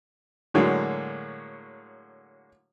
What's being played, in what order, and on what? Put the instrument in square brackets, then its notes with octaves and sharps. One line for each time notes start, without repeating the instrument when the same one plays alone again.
[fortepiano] A2 D3 F#3 G#3 A#3